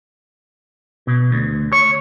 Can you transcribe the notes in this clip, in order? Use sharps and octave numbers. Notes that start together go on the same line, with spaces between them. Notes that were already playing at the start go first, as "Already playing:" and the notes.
B2
D2
C#5